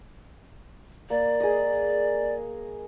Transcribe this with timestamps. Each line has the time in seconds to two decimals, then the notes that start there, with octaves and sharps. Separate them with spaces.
1.10 A#3 D5
1.40 G#4 D#5